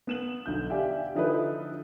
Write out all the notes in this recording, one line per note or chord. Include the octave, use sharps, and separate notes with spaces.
B3 E7 F#7
B1 D3 G6
G4 D5 E5 F5 G5 G#5
D3 F3 D#4 E4 A4 B4